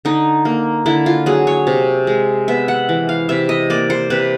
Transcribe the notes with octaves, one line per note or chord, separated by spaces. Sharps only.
D3 D#4
A#3
D3 E4
F4
F#3 G#4
C#5
C3
G#3
B3 E5
F#5
E3
F5
C3 E5
D#5
A#3 D5
C5
C3 B4